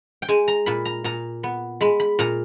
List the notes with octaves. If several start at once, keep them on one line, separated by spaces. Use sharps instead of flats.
G5
G#3 G#5
A#5
A#2 B5
A#5
A#2 A#5
B3
G#3 B5
B5
A#2 A#5